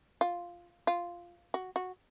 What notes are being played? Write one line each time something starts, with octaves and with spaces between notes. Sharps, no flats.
F4
F4
F#4
F#4